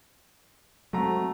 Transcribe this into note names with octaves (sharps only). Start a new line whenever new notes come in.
F#3 G#3 A3 C4 F#4 A#5